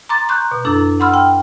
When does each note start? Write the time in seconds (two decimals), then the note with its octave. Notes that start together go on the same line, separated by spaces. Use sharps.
0.09 A#5 C6 D6 A6
0.29 A#5 C6 C#6 F#6 G6
0.51 B2
0.65 F#2 D4 E4 A4
1.00 F#5 B5 C6 E6 F6
1.14 G5